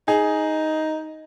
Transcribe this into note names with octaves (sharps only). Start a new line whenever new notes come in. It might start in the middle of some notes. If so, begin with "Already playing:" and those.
D#4 G#4